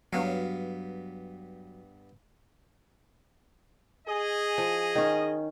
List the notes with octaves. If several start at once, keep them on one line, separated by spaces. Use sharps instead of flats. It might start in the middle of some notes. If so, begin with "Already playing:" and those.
G2 F#3 B3 F5
G#4 D#5
F3
D#3 C#4